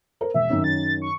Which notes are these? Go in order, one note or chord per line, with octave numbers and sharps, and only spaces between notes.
A#4 C5
E1 E5
F#2 D#3 C#4
A6
C#6